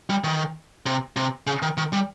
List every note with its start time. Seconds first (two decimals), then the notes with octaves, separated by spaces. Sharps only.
0.09 G3
0.24 D#3
0.86 C3
1.16 C3
1.47 C#3
1.62 D#3
1.77 D#3
1.93 G3